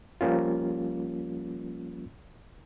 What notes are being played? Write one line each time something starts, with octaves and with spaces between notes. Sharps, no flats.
F3 G3 A#3 C#4 F4